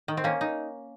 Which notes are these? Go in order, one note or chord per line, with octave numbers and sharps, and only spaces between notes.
D#3
C4
A#3 C#4
D#4